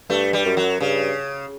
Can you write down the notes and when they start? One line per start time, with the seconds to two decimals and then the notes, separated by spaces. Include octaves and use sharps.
0.09 G2 A3
0.33 G3
0.45 F#2
0.57 F#3
0.80 G2 C#3